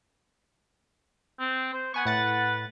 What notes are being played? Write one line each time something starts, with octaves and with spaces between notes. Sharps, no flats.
C4
C5
B3 F#5 G#5 C#6
A2 B4 F#5 A6